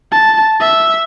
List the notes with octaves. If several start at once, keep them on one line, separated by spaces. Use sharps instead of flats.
A5
E5